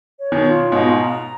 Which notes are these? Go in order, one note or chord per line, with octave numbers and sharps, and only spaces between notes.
C#5
B2 D#3
F4
G#2 B2 D#5
A#5